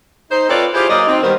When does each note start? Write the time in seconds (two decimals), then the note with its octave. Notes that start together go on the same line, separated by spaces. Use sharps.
0.30 D#4 C5
0.49 C4 F4 A4 B4 C#5 D5
0.74 E4 F4 G4 G#4 C5
0.89 F#3 A#3 D5 D#5
1.08 C4 D#4
1.22 D#3 G3 B3 A#4 C5